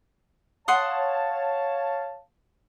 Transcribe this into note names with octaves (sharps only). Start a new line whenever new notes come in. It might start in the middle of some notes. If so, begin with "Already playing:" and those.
C#5 F5 F#5 A5 C6 D#6